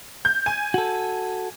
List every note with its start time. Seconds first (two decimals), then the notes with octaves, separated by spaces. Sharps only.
0.25 G6
0.46 G#5
0.74 F#4 A4